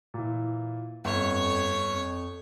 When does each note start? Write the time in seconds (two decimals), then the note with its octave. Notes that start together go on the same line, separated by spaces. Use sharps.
0.14 A#2 E3
1.05 G1 F2 C#5
1.85 F2